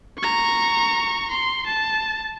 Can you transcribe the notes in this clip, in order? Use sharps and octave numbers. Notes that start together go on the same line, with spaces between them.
A#5 C#6
C6
A5